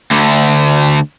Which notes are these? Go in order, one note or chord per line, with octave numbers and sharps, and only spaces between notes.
D2 D3